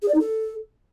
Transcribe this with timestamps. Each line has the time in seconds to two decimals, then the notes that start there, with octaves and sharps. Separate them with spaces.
0.02 G#4
0.08 D5
0.14 D#4
0.20 A4